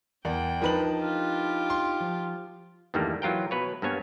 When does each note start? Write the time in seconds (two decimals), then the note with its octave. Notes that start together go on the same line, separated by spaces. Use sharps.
0.25 E2 A#4 D5 G5 G#5
0.62 F3 D4 D#4 A#4 B4 F#7
0.97 F4 G4
1.70 C6
2.00 F3
2.94 E2 G2 D#3 G3 A3 A#3
3.22 E3 F#3 F4 A#4 G5
3.51 B2 B4 C#5
3.82 G2 A#3 B3 C#5 G#5